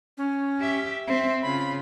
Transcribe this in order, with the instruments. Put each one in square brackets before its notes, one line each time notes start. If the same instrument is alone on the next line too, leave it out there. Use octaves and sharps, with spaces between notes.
[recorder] C#4
[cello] G4 E5
[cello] C4 [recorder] E5
[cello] C#3 F4 [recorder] B5